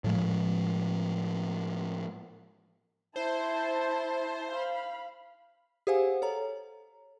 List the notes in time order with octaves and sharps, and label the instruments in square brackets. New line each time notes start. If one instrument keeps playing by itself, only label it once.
[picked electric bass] A2 F3 G#3
[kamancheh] E4 A5 [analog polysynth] C5
[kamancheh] F5 B5
[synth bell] G4 G#4 C5 F5 F#5 G#5
A4 C#5 A#5